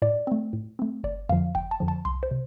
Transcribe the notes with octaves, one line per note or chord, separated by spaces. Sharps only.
A2 D5
A3 C4
A2
A3 C4
G1 D5
F2 D3 F3 F5
G1 G5
A5
F2 D3 F3
A5
C2 C6
C5
C3